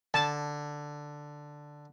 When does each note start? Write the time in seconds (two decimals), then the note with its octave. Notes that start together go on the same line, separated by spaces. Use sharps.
0.14 D3 A5